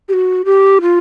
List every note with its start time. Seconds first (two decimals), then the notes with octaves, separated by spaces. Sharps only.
0.09 G4
0.13 F#4
0.45 G4
0.82 F4